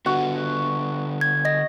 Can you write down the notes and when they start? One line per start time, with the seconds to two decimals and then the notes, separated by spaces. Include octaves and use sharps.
0.06 D3 B3 F#4
1.21 G#6
1.45 D#5 A#6